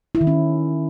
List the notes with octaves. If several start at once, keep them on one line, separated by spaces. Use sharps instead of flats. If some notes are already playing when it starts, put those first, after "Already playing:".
E4
D#3
C#4